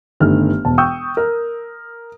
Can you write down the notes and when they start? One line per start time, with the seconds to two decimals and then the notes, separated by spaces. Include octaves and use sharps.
0.20 G1 G2 D#3 A3 F6
0.65 E1 A5
0.78 G5 C#6 D#6 E6 G6
1.17 A#4